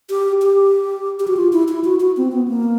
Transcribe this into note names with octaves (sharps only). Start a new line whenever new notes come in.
G4
G4
G4
F#4
F4
E4
E4
F#4
F#4
C4
B3
A#3